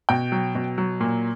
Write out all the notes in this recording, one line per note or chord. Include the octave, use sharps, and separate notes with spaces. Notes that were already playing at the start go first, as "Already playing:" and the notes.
B2 G5
F#3
B2
F#3
A#2